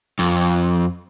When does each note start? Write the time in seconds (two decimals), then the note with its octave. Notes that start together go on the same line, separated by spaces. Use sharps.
0.19 F2